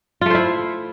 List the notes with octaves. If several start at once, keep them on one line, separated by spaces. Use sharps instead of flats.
A3 E4 F4 C5